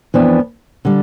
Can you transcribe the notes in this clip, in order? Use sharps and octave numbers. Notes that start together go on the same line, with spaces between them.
F2 E3 B3 D4
D3 G3